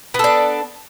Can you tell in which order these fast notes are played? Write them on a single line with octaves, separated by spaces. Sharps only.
B3 A4 D4